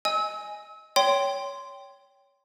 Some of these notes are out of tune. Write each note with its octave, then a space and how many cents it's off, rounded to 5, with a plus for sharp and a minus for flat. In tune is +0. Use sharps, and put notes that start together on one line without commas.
D#5 +0 G#5 +0 E6 -35
C#5 +15 G5 +0 C6 -10